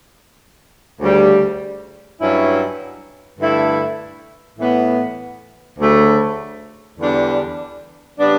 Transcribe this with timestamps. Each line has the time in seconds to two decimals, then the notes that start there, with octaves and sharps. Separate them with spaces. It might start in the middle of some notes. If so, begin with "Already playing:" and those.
1.00 D2 C#3 G3
2.19 G2 F#3 C#4 E4
3.39 G2 D3 A3 E4
4.59 A2 E3 B3
5.78 D2 C#3 F#3 A3
6.98 E2 D3 G3 D4
8.18 C#3 G3 B3 D4